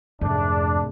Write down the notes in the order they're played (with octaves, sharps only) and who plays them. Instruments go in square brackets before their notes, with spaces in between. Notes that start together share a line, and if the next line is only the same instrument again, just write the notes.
[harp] C2 G#2 A3 [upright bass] F2 [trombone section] D4